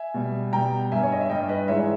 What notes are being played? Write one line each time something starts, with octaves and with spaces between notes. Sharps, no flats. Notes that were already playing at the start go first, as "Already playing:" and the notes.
Already playing: E5 G#5
B2 G3
B2 G3 G5 A#5
G2 G3 E5 G#5
C#5
D#5
E5
G2 G3 D#5 G5
B4 D#5
G#2 E3 G#3 C#5 E5